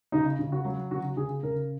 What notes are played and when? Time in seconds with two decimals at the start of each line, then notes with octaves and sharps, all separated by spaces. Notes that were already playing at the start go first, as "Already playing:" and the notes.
0.12 C#3 D#4
0.39 C#3
0.52 F#4
0.65 F#3
0.91 C#3 F#4
1.17 C#3 G#4
1.43 C#3 A#4